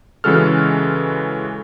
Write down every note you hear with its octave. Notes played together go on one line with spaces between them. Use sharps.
C#3 E3 G#3 F#4 A4 F6